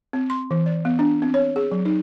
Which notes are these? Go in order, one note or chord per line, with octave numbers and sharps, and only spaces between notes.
C4
C6
E3
D5
B3
D4
C4
C#5
G#4
F#3
D#4